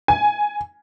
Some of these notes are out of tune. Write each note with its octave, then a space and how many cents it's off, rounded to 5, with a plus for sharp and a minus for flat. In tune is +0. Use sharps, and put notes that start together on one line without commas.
G#5 +5